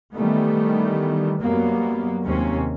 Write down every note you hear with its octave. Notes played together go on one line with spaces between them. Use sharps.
D#3 E3 G3 A3 B3
F#2 F#3 G3 A#3 B3
D#2 C3 G#3 A#3 C4 C#4